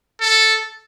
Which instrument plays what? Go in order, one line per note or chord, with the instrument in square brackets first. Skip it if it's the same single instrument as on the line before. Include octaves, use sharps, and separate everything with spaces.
[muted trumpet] A4